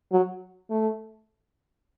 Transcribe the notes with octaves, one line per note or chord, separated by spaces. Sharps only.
F#3
A3